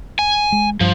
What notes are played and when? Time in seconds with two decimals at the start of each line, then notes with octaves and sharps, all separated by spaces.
0.19 G#5
0.52 G#3
0.80 G2 F3